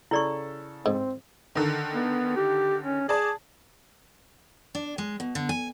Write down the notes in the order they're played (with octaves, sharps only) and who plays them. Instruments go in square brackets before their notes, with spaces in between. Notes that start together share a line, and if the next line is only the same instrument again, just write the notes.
[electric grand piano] C#3 A4 [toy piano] E4 D5 C#6
[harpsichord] G#2 [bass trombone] C4
[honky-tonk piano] D3 D#3
[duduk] B3
G4
C#4
[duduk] G#4 [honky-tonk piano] D5 A5
[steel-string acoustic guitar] D4
G#3
B2
D3
G#5